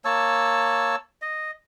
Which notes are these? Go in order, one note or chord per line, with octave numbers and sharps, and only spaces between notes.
A#3 C#5 A5 E6
D#5